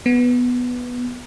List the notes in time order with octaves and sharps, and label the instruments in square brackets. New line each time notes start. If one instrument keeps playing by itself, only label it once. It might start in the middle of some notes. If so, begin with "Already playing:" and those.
[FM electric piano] B3